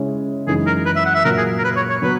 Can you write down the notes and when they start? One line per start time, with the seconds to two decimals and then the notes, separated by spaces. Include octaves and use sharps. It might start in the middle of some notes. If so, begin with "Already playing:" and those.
Already playing: C#3 G#3 C#4 E4
0.47 F#2 C#3 E3 G#3 D#4 G#4
0.67 A#4
0.86 B4
0.96 E5
1.05 F#5
1.15 E5
1.25 A#2 F#3 A#3 A#4
1.38 G#4
1.59 A#4
1.64 B4
1.77 C#5
1.90 C#5
2.02 F#3 B3 B4